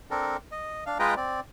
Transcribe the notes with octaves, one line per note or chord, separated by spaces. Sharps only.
C4 D4 A4 A#4
D#5
D4 F5
G#3 F4 B4 D#5 G5 A#5
C4 D5